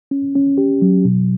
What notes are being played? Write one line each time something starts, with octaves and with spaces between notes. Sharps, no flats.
C#4
C#4
G4
F#3
B2